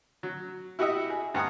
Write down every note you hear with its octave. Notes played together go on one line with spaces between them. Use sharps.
F#3
E4 F#4 G4 D#5 E5
G#4
G2 F#5 A#5 D#6